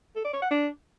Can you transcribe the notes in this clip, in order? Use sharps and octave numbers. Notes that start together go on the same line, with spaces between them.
A4
D5
C#5
F#5
D4